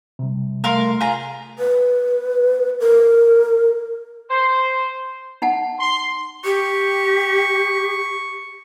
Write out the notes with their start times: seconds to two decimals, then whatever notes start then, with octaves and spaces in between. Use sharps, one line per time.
0.19 C3 G3
0.64 A3 A#4 F5 C6
1.01 F4 G#4 A#5
1.59 B4
2.80 A#4
4.30 C5
5.42 D#4 F#5 A5
5.79 C6
6.44 G4 C#6